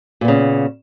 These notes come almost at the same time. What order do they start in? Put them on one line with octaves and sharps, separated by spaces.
A#2 B3 C#3